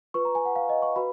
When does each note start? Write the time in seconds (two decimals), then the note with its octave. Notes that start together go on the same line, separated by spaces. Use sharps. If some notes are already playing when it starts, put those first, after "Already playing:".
0.14 F4 B4 C#6
0.25 A#5
0.35 G#5
0.45 F#5
0.56 F5
0.69 D#5
0.82 C#6
0.96 F#4 B4 B5